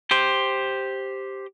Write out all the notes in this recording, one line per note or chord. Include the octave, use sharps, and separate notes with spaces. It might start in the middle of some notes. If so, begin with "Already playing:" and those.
G4 C5